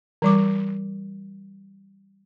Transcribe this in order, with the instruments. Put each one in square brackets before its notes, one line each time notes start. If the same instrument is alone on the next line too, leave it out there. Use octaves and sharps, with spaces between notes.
[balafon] E3 G3 D6